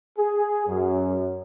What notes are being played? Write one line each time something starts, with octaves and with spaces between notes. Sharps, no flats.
G#4
F#2